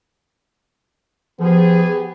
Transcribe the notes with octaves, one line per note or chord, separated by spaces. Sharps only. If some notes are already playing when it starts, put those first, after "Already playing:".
F3 B3 G4 G#4